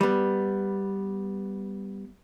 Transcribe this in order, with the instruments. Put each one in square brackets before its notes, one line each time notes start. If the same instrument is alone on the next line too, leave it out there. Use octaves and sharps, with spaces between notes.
[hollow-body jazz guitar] G3 B3